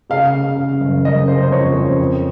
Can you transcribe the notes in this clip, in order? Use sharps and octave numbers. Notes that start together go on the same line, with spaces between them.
C#3 F5
C#3
C#3
F#1
F#1 D#5
C#3 C5
C5
F2 C#5
F2
C4